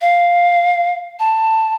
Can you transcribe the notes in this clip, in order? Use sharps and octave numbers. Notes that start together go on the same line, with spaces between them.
F5
A5